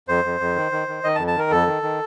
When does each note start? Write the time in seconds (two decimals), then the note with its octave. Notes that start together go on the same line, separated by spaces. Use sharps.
0.08 F2 C5
0.25 F2
0.40 F2
0.56 D#3
0.72 D#3
0.88 D#3
1.04 D#3 D#5
1.15 A5
1.19 F2
1.27 A5
1.35 D#3 A#4
1.51 F2 A4
1.67 D#3
1.83 D#3